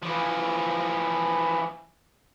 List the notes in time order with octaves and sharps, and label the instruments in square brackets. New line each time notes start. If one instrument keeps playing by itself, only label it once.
[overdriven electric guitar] E3 F3